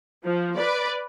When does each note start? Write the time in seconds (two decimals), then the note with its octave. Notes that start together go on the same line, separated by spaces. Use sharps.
0.25 F3
0.57 B4 D5